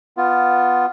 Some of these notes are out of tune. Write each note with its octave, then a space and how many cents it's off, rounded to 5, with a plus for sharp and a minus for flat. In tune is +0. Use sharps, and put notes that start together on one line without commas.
B3 +0 F4 +0